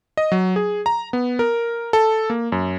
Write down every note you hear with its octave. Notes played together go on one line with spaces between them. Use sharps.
D#5
F#3
G#4
A#5
B3
A#4
A4
A#3
F#2